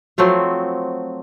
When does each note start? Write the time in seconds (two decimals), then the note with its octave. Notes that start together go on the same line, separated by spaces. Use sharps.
0.18 F3 F#3 A3 C4